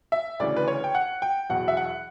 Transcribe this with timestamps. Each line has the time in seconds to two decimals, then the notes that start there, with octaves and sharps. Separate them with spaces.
0.12 E5
0.40 D2 C#3 E3 D5
0.57 B4
0.68 C#5
0.84 G5
0.95 F#5
1.22 G5
1.50 E2 B2 F#3 F#5
1.68 E5
1.77 F#5